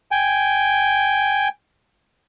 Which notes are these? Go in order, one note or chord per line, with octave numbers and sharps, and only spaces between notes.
G5 G#5